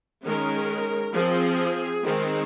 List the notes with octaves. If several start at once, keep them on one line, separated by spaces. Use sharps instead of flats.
D#3 G#3 C#4 A#4
F3 C4 G#4
D#3 G#3 C4